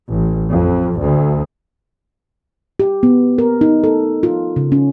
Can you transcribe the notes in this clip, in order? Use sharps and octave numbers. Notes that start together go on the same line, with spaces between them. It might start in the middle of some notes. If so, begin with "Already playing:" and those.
A1
F2
D2
G4
B3
A#4
D#4
A4
F4
C#3
C#4